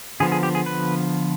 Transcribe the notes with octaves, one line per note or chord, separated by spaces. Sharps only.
D3 F3 B3 G#4
G#4
G4
G#4
B4